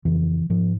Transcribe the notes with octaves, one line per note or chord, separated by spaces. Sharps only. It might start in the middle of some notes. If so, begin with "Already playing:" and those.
F2 C#3 E3
G#2 F3